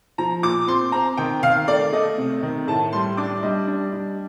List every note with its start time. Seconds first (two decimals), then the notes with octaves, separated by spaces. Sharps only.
0.18 F3 A#5
0.43 A#2 D6
0.67 C4 C6
0.92 C4 A#5
1.17 D#3 G5
1.43 D#3 F5
1.68 A3 D5
1.92 A3 D#5
2.18 C3
2.43 D#3
2.67 A2 A5
2.93 G3 C6
3.17 D4 D6
3.43 G3 D#5
3.67 D4
3.93 G3